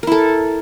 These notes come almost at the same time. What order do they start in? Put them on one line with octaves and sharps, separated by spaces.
A#4 E4 A4